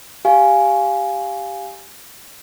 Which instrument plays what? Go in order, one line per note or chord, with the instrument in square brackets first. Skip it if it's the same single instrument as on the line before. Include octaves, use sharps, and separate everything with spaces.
[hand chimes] G4 F5 G#5